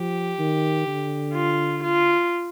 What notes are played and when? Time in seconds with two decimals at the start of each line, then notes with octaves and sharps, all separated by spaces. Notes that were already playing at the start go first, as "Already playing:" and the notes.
Already playing: F3 G4
0.39 D#3
0.87 D3
1.35 F4
1.84 F4